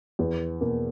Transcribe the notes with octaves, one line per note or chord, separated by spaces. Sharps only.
E2
B2 A#3